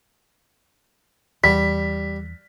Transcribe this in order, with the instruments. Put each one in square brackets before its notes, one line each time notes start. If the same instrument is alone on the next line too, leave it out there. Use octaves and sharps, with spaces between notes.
[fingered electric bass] E2 [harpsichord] G3 [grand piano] B6